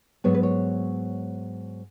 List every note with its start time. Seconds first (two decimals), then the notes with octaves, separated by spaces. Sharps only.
0.24 G#2 F#3 B3 C#5
0.34 B4
0.43 C#5